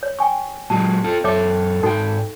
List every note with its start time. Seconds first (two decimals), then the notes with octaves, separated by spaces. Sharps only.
0.03 C#5
0.19 G5 G#5 C#6
0.70 A#2 F#3 G#3 A5
1.04 F4 A4
1.24 F#2 A4 C#5 E5 D6
1.83 G#2 D#4 F#4 A4 G5